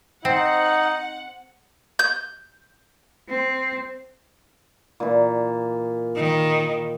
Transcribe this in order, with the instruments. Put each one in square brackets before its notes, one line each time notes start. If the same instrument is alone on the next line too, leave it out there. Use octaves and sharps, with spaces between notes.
[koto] C4 [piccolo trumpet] D#4 [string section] F#5
[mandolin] G6
[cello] C4
[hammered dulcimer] A#2 E3
[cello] D#3